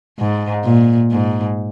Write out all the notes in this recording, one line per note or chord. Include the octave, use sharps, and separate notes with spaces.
G#2
A#2
G#2